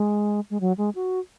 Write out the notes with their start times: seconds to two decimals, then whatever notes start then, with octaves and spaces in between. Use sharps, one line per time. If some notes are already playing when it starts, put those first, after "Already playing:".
Already playing: G#3
0.50 G#3
0.61 F#3
0.78 G#3
0.95 F#4